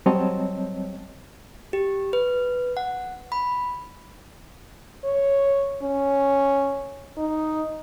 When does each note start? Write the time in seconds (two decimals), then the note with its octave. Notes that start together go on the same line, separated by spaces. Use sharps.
0.06 F#3 G3 C4 C#5 D#5 A5
1.73 G4
2.13 B4
2.77 F#5
3.32 B5
5.04 C#5
5.82 C#4
7.18 D#4